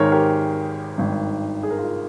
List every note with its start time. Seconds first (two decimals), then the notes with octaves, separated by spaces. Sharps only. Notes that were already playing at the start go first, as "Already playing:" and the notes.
Already playing: G#1 G#2 D#3 G#4 A#4 C5 C#5
0.12 G4 A#4
0.98 G#1 G2 D#3
1.63 G#4
1.71 A#4
1.78 F4 G#4